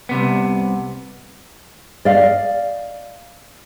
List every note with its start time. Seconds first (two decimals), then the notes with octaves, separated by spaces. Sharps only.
0.09 C2 C3 B3
2.05 D5 D#5 F5